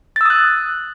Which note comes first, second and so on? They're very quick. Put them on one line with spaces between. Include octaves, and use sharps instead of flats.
A6 E6 D#6 F#6